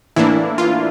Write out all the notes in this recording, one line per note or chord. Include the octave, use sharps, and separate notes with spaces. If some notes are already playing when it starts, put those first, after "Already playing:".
A2 E3 A#3 D4 E4
F4